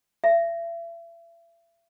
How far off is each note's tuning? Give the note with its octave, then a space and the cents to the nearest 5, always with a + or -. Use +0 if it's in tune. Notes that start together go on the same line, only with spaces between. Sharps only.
E5 +35